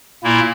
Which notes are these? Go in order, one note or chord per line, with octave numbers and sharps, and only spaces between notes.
A#2 A#3 E4